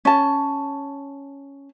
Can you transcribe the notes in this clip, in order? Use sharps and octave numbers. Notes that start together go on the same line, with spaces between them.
C#4 A5